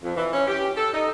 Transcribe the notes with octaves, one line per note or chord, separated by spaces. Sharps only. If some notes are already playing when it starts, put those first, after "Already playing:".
F2
E3
C#4
G4
A4
D#4